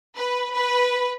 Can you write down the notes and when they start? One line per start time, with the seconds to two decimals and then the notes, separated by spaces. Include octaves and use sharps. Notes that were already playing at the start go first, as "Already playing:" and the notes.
0.16 B4
0.54 B4